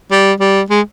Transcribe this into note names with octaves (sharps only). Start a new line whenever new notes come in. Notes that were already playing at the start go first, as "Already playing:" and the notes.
G3
G3
G#3